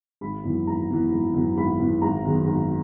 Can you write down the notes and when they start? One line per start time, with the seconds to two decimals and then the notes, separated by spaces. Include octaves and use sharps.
0.21 G#1 B5
0.44 F#2 E3 B3
0.66 G#1 A#5
0.89 F#2 E3 B3
1.12 G#1
1.34 F#2 E3 B3
1.57 G#1 B5
1.79 F#2 E3 B3
2.02 G#1 A#5
2.25 F#2 D#3 G#3 B3
2.47 G#1